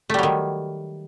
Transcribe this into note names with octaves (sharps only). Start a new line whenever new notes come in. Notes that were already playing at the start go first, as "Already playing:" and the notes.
D#3 F#3 G3 A3